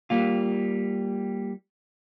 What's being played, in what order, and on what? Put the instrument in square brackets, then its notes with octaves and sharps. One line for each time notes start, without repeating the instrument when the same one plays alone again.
[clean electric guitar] G3 A#3 F4